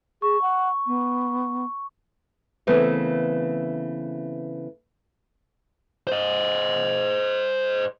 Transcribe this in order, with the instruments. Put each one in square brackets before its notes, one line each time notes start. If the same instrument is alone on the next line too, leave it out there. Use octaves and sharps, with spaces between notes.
[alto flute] G#4 [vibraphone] C#6
[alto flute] F#5
B3
[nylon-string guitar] C#3 E3 A3 B3 C4 A#4
[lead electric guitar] C5 D#5